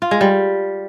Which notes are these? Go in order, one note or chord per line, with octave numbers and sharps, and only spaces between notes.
F4
G#3
G3